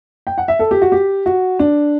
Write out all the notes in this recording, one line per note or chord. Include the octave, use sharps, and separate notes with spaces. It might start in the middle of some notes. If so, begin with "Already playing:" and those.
G5
F#5
E5
A4
G4
F#4
G4
F#4
D4